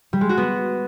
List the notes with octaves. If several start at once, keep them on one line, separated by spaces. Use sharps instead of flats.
G3
G#3
F#4
B3